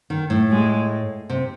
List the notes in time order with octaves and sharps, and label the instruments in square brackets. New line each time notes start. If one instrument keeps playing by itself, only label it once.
[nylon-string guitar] D#3
A2
[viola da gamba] G#3
[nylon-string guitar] C3